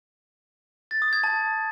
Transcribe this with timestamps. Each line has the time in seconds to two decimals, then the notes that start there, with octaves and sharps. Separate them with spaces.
0.91 A6
1.02 D#6
1.13 G#6
1.24 A5